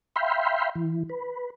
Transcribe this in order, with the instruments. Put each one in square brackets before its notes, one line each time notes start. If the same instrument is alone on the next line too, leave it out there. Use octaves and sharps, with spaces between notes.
[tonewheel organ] E5 F5 G5 B5 C6
E3
B4